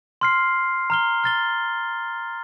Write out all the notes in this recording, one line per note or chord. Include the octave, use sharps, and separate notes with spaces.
C6 F6 C7
A#5 F6 G7
F6 A6 G7